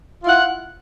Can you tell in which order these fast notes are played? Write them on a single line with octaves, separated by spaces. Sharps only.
F4 E4 F#5